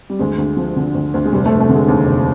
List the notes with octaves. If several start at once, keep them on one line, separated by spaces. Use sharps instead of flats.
G3
D2 G#3
D2
F3
D3
D2
D2
G#3
F1 G3
A3
F1
A3
D3
G#3
D#2
F1